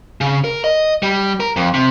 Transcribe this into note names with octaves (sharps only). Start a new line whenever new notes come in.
C#3
A#4
D#5
G3
A#4
F2
C3